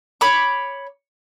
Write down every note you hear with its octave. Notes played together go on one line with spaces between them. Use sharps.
C#5 B5 D6